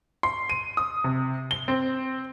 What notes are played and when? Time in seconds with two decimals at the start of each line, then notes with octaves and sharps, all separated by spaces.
0.23 C6
0.49 D#7
0.77 D#6
1.04 C3
1.51 G7
1.68 C4